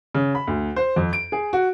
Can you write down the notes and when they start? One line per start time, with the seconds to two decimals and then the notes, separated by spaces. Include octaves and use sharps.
0.15 C#3
0.35 B5
0.47 D2
0.76 C5
0.96 F2
1.13 D7
1.32 G#4
1.53 F#4